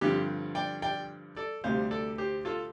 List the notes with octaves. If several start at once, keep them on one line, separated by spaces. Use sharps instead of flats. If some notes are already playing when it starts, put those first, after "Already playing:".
G2 D3 F3 C4 G4
D5 G5
D5 G5
A4 D5
D2 C3 G3 D4 C5 F5
A4 D5
G4 C5
F4 A4